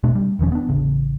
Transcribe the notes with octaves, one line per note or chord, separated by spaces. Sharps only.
B2 A3 D4
G3
E1 D#3 F3 C#4
B3 D4
A1 C#3